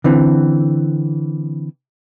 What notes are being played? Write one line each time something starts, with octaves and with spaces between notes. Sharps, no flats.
D3 E3 C4